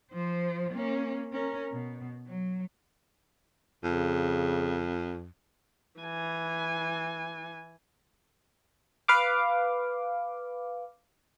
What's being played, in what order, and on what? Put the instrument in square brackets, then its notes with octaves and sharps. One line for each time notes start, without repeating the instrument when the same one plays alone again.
[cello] F3 C5
A#3 C#4
C#4 A#4
B2
F#3
[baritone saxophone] F2 [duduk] C#3
[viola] E3 G#5
[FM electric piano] B4 F5 D6